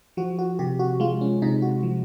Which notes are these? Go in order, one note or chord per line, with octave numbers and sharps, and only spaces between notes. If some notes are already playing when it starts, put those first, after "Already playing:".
F3 F#4
F#4
C3 G4
F#4
G#3 F4
C#4
C3 D#4
F#4
F3